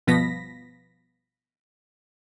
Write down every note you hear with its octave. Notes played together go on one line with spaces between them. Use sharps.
G1 B2 F3 B3 A#6 B6